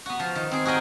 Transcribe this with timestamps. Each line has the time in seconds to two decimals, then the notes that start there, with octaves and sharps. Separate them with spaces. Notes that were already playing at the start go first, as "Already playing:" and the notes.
0.06 B3 F#4
0.19 F3 F5
0.35 D#3
0.51 C4 G#4
0.65 F#4 G#4 A#4 D#5 G5